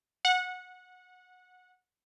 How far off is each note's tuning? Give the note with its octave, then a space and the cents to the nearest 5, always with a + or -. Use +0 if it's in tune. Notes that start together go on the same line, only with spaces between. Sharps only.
F#5 -20